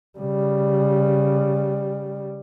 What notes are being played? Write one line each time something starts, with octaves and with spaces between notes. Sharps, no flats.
C#3 G3